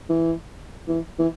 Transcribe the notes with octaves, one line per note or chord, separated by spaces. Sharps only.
E3
E3
E3